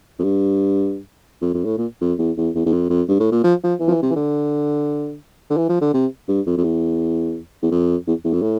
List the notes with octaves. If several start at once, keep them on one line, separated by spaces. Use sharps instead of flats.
F2
G2
F2
F2
A2
A#2
F2
E2
E2
E2
E2
F2
F2
G2
A2
A#2
F3
F3
E3
F3
E3
C3
E3
D3
D3
E3
F3
D3
C3
G2
F2
F2
E2
E2
F2
E2
E2
F2
A2